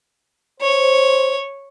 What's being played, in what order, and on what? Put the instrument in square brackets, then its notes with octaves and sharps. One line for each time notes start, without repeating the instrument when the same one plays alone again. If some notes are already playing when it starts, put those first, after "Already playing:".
[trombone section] C5 [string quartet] C#5